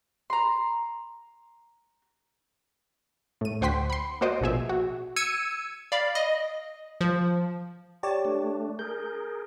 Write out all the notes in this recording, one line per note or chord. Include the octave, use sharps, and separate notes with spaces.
A#5 C6
A2 D#7
D2 C5 F#5 G5 C6 B6
B5 C6
A#3 F#4 C5 D5 D#5
A#1 B2 G#4 E5
F#4
E6 G#6 C#7 D#7
D5 F5 B5
D#5
F3
G4 C#5 D5 A5
A3 D4
G#4 A#4 G6